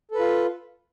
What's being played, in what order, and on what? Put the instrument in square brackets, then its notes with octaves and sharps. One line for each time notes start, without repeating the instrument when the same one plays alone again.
[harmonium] A4
B4
F4